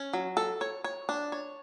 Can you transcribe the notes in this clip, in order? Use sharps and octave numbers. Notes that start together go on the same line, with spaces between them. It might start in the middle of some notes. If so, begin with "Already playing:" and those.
Already playing: C#4
F#3
A4
C#5
C#5
D4
C#5